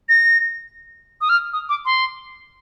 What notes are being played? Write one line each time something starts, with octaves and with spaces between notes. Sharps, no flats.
A#6
D#6
F6
D#6
D6
C6